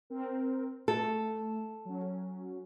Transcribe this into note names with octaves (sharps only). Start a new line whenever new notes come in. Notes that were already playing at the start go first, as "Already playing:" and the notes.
C4 A#4
A3 A4
F#3 C#4